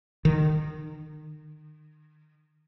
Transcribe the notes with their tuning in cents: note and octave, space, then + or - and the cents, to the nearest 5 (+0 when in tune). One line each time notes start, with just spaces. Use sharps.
D#3 -30